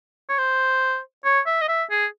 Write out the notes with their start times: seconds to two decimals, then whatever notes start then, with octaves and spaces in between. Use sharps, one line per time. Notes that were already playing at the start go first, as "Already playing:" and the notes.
0.29 C#5
0.38 C5
1.25 C#5
1.46 E5
1.61 D#5
1.68 E5
1.91 G#4